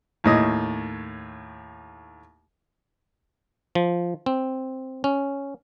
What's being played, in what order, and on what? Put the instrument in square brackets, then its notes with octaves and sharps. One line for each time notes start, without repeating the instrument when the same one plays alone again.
[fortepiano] D#2 A2 D#5
[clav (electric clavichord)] F3
C4
C#4